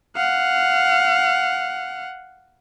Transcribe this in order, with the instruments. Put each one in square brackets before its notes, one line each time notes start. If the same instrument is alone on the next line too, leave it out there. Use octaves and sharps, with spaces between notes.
[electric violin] F5 F#5